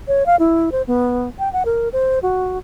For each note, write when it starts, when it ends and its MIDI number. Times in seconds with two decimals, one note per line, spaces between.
0.08 0.26 73
0.26 0.36 77
0.39 0.70 64
0.72 0.82 72
0.87 1.29 59
1.39 1.52 79
1.53 1.63 78
1.65 1.89 70
1.93 2.19 72
2.23 2.58 66